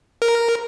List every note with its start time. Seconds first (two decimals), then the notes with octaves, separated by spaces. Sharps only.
0.22 A#4